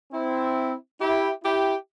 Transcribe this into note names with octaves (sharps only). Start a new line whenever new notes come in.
C4 E4
E4 G4
E4 G4